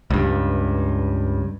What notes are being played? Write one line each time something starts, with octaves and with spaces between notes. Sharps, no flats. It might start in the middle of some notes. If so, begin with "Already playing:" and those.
C#2 G2